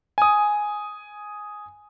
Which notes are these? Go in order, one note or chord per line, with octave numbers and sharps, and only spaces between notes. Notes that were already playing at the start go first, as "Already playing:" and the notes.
G#5 D#6